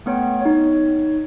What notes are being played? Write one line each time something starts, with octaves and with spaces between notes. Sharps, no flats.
A3 B3 C#5 G5
D#4 C#5